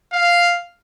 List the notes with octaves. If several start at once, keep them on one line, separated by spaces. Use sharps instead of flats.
F5